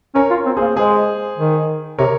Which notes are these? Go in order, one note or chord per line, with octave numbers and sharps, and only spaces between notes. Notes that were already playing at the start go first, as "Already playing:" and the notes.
C#4 A#4 C#5
F4
C4
A#3 G#4 C5
G#3 G#4 C5
D#3
C3 A#4 C#5